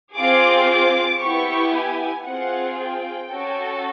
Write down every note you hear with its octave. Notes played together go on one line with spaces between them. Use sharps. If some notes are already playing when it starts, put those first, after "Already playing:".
C4 F4 G#4 D6
D6
B3 E4 G4 C#6
G#5
C4 F4 G#4 F#5
G5
C#4 F#4 A4